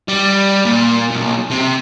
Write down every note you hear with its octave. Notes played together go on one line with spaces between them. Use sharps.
G3
A#2
B1
C3